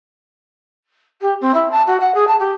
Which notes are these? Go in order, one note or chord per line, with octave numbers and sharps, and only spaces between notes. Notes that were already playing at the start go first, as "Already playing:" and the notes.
G4
C4
E4
A5
F#4
F#5
G#4
A5
G4